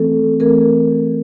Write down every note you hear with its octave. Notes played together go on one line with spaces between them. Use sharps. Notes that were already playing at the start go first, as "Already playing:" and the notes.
Already playing: E3 A3 C4 A4
E3 A3 C4 A#4